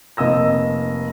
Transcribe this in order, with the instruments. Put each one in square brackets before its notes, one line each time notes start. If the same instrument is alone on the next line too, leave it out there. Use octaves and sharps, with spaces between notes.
[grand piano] F1 A#3 D#5 E6 A#6